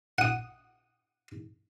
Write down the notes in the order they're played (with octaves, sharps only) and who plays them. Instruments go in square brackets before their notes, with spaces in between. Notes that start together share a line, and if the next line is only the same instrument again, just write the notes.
[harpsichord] F#5 D#6